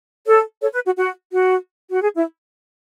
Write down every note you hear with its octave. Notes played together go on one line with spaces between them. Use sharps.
A4 C#5
A4 C#5
B4
F#4
F#4
F#4
F#4
G#4
E4